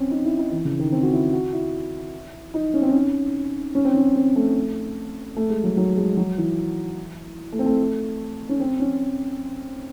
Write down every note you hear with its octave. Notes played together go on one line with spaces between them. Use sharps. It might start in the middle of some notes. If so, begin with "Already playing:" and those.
Already playing: C4 C#4
D#4
E4
D#4
E3
C#3
D#3
C4
F#4
E4
F#4
E4
D#4
C#4
C4
C#4
C#4
C4
C#4
C4
A3
A3
G#3
F#3
F#3
G#3
F#3
E3
A3
C4
A3
C#4
C4
C#4